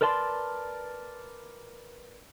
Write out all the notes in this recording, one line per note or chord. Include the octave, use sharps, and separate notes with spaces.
A#4 B4 D5 A5 C6